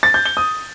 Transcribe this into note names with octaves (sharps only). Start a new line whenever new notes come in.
A6
G6
G7
D#6